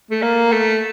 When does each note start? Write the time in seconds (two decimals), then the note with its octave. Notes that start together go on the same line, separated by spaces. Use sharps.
0.11 A3
0.22 A#3
0.52 A3